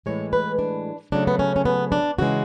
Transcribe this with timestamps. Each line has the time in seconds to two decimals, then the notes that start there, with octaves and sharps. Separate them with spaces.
0.06 A2 E3 G#3 C#5
0.33 B4
0.59 D4
1.12 C#3 F#3 A3 D4
1.27 B3
1.39 C#4
1.56 C#4
1.65 B3
1.92 D4
2.19 C#3 E3 G#3 F#4